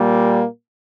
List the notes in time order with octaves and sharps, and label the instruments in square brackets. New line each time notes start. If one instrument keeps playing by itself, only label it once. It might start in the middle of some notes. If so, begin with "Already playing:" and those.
Already playing: [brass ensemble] A#2 G3 A#3